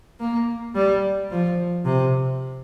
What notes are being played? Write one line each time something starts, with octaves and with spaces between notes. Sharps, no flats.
A#3
G3
F3
C3